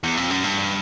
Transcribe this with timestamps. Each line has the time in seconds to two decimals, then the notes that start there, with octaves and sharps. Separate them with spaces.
0.04 E2
0.17 F2
0.31 F#2
0.44 G2